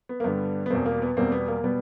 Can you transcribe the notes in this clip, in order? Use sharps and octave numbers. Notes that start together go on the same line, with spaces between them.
B3
A#3
G2 D3 G3 B3
B3
E2 B2 G3 A#3 C4
A#3
B3
E2 B2 G3 A#3 C4
B3
A#3
B2 G3 B3